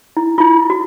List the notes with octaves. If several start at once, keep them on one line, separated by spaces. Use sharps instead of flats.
E4
E4 F4
F#4